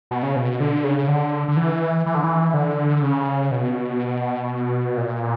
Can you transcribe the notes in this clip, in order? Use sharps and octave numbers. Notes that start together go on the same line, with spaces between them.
B2
C#3
B2
D3
C#3
D3
D3
E3
E3
D3
E3
D3
C#3
B2
A#2